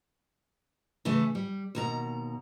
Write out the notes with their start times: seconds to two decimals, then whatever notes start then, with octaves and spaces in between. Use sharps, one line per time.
1.05 C#3 E3 A3
1.35 G3
1.75 D#2 B2 A#5